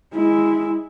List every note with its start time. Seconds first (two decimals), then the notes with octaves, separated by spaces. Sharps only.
0.14 G#3 E4